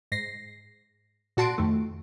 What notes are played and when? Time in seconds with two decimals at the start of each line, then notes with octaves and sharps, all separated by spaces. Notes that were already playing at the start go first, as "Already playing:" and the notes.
0.12 G#2 A#6 C7
1.37 A#2 F#4 A5 C6 D7
1.58 F2 D#3 A3